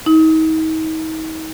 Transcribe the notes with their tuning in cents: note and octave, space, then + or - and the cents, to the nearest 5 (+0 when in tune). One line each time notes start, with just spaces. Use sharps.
D#4 +35